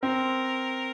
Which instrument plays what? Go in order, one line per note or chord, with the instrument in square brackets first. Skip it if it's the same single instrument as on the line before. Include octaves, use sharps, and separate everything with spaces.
[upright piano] C4 [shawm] A#4